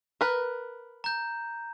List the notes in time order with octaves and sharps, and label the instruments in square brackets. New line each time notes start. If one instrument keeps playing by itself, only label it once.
[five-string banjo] A#4 B4
[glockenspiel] A#5 G6